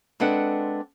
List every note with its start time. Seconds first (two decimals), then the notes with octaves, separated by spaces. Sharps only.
0.20 G#3 C4 D4 A4 B4 F#5